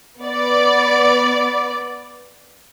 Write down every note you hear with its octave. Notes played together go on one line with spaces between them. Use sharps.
B3 D5